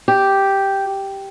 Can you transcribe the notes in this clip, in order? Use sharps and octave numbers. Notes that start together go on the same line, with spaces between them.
G4